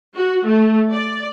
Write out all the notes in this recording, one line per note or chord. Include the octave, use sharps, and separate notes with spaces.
F#4
A3
D5